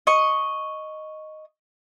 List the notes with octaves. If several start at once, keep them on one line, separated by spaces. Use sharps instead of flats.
D#5 C#6